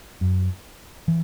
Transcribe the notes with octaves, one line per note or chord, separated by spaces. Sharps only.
F#2
E3